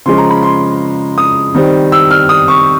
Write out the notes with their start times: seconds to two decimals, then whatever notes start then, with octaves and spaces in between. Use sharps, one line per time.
0.06 C#3 F3 G#3 C#4 C6
0.18 A#5
0.30 B5
0.43 C6
1.18 D#6
1.55 D#3 G3 C4
1.92 E6
2.11 F6
2.29 D#6
2.48 C#6